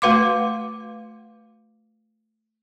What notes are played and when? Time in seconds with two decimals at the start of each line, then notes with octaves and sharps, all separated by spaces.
0.02 A3 F#4 B4 F5 C6 D6